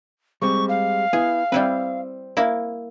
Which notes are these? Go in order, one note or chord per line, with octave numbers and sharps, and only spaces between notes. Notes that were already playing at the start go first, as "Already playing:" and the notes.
G3 G#3 C4 C#6
F5
B3 E4 G#4
G3 C4 E4 B4
A#3 E4